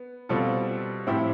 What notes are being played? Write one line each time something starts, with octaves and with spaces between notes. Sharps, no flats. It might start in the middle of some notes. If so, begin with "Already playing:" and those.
Already playing: B3
B2 G3 C4 F4 A4
A2 F3 C4 E4 G4